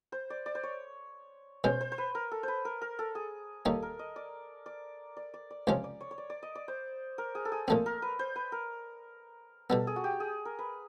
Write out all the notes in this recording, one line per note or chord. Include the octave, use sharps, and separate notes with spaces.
C5
D5
D5
C5
C#5
B2 G#3 C#4 C5
C5
C5
B4
A#4
A4
B4 C5
A#4
A#4
A4
G#4
D#2 D#3 G3 A#3 D#4 A4
A#4
D#5
D5
D5
D5
D5
D5
C#2 C3 F3 G#3 C#4 D5
D5
C#5
C#5
D5
D5
D#5
D5
C5
A#4
G#4
A4
G#4
A#2 F3 A3 C4 A4
A#4
B4
C5
B4
A#4
B2 G3 B3 A4
G#4
F#4
G4
G#4
A#4
B4